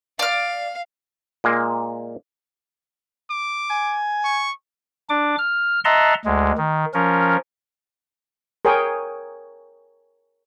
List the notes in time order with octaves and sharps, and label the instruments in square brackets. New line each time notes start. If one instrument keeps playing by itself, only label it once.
[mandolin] D5 F6 [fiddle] F5
[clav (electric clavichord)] A#2 G#3 A#3
[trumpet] D6
[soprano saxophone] G#5
[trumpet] C#6
[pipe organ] D4 D6
F6
D#5 E5 F#5 A5 A#5 C6
D2 G#3
D#3
F3 C#4 A#4
[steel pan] G#4 A#4 C#5 G5 G#5 D#6